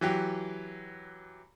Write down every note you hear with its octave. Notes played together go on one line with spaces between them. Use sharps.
E3 F#3 G4